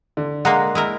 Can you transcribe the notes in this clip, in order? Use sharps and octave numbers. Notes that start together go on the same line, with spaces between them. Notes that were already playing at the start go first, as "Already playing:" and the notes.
D3
G#3 A#3 F#5 A#5 C6
G#3 E4 A#4